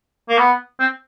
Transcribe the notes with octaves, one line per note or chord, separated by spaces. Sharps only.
A#3
B3
C4